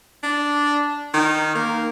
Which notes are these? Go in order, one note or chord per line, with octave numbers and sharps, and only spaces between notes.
D4
D#3
A#3